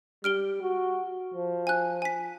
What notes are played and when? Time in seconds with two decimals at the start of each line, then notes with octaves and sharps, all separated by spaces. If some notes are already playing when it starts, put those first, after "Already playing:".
0.24 G3 F6 D7 G7
0.62 F#4
1.34 F3
1.67 G#5 F#6
2.02 G#5 B6